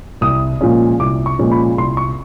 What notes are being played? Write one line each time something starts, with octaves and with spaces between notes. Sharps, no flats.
C2 D#6
A#2 F3 G#3 C#4
C2 D6
C#6
A#2 F3 G#3 C#4
B5
C2 C6
C#6